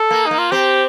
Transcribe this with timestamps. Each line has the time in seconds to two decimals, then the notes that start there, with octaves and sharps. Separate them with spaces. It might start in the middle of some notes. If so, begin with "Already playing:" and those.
Already playing: A4
0.11 A#3
0.26 A#3 D#4
0.38 F4
0.52 C4 G4